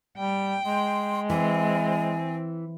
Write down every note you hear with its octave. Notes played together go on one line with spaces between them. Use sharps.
G3 G5
G#3 C6
E3 C4 G#5